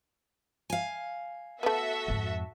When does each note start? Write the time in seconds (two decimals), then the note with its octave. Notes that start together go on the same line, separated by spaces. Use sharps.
0.70 F5 G#5
1.63 A3 B3 F#4 A4 E5
2.08 F2 G#2